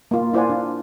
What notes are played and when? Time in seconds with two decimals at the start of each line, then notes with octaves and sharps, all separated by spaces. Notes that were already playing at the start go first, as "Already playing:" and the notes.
0.11 A#3 F4
0.33 E4 F4 C5 D5 F#5 G#5
0.50 D4